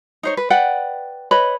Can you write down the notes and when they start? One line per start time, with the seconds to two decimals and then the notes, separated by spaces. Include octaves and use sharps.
0.23 D#4 C5 C#5
0.37 B4
0.50 B4 D5 F#5 G5
1.31 B4 C#5 D#5 B5